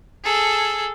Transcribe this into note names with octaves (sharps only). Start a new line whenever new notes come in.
G#4 A4